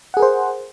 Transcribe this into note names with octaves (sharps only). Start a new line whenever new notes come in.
G#4 A#4 C5 F#5